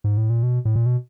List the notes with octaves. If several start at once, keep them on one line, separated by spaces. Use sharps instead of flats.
G#2
A2
A#2
B2
A2
A#2
B2